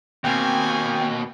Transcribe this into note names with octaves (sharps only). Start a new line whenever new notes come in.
D#2 B2 A#3 C4 G5 G#5